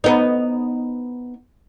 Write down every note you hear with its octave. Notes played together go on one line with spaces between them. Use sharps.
B3 D#4